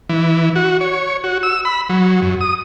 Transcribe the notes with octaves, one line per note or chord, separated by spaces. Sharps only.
E3
F#4
C#5
F#4
E6
B5
F#3
F#2
D#6